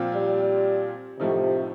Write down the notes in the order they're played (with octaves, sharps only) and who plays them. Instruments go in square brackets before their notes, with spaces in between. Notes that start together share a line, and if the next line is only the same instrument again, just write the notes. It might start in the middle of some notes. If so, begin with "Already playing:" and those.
Already playing: [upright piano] A#2 F3 C4 F4
[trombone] G3
[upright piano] A2 F3 A3 D#4 [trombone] C3